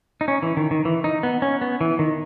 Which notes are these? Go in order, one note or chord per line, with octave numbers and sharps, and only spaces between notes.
D#4
C#4
E3
D#3
D#3
E3
D#4
B3
C#4
B3
E3
D#3